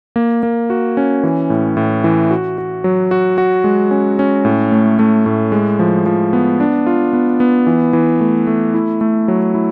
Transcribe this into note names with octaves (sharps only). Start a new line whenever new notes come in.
A#3
A#3
F#4
C#4
E3
A2
A2
E3
F#4
F#4
F#3
F#4
F#4
G#3
C#4
C#4
A2
A3
A3
A2
G#3
F3
F3
B3
D4
F4
B3
B3
E3
E3
A3
A3
E4
A3
F#3
E4